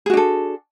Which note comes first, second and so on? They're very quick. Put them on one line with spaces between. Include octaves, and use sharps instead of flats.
G#4 F#4 D4 A4